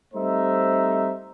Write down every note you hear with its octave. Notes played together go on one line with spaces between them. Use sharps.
G3 A3 C4 D#4 C5 E5